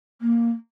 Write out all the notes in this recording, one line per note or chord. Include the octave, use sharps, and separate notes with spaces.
A#3